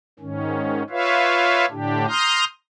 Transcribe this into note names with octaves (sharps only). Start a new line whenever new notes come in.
G#2 D#3 C#4
F4 B4 C#5 E5 F5
A2 D3 D4 G4
A#5 C6 D#6 F6 G6